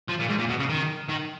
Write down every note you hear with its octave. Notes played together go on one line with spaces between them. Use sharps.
F3
A#2
G#2
A#2
B2
C#3
D#3
D#3